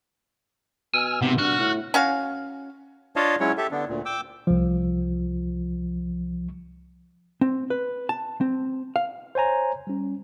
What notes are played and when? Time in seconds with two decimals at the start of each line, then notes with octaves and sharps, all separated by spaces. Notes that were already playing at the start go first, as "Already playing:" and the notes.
0.94 B2 G#5 E6 F6
1.22 G#1 C3 B3
1.38 G2 F#4 F6 F#6
1.59 A2
1.94 C#4 F#4 F5
3.16 D4 F4 C#5 D#5 F5 A5
3.40 F#3 G#3 C#4 E4 C#5
3.57 G4 A4 E5
3.72 D3 B3 D4
3.89 D2 A#2
4.05 G5 D6 E6
4.47 C2 F3
7.41 C4
7.70 B4
8.09 A5
8.41 C4
8.96 F5
9.35 C5 C#5 G#5 A#5
9.87 G3 C#4